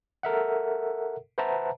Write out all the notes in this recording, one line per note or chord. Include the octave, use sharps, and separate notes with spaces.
A4 A#4 E5 F#5
B4 C5 E5 F#5 A5 A#5